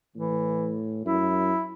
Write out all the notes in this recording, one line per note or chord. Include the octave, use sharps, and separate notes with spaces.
A2 E3
F#2 E4